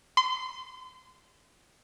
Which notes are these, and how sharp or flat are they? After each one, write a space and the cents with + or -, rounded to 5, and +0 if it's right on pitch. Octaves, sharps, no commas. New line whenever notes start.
C6 -30